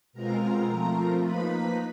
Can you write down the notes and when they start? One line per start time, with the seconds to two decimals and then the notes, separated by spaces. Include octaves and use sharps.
0.13 B2 G#3 C4 F4 A#4 A#5
0.68 F3 A3 C4 F4
1.22 F3 A#3 D#4 B4 B5